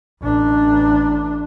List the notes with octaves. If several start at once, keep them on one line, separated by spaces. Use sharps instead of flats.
A1 D4